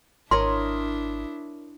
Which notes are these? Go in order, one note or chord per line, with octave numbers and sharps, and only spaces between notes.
G#1 D4 E4 A#4 C#5 D#5 C6